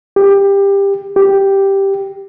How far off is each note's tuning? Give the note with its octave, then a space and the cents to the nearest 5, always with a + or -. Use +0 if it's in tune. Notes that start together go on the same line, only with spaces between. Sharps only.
G4 +20
G4 +0